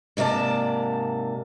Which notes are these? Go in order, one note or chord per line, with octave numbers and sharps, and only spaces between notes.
G#2 C3 A#3 D5 A5